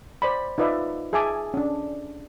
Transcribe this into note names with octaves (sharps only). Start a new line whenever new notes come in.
C5 D5 B5
D#4 F4 B4 D5 E5
G#4 E5 G#5 A5 D6
C#4 D4